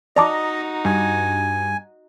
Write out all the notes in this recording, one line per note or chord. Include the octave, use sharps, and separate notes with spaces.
D#4 F#4 D5 D#5 A5 A#5 D6
G2 G#5